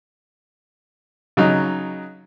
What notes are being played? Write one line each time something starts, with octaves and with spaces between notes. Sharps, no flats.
C#3 F#3 D#4